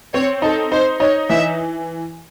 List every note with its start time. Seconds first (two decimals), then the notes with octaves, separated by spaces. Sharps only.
0.14 C4 C#5
0.42 D#4 A4
0.72 D#4 C5
1.00 D#4 C#5
1.29 E3 E5